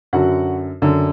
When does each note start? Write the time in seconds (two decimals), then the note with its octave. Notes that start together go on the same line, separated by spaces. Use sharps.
0.13 F#2 D3 F#4 F#5
0.82 F#2 D3